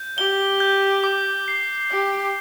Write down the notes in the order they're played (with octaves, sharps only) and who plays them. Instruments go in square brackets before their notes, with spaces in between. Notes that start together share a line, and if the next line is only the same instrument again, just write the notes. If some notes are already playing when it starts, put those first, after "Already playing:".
Already playing: [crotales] G6
[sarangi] G4 [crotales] G7
[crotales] G6
D6
C7
[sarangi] G4 [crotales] D6